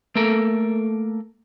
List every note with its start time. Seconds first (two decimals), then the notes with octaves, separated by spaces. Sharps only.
0.16 A3 A#3 A4 A#4